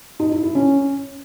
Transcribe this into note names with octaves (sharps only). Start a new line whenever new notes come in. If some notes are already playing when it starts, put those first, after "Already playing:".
D#4
E4
E4
C#4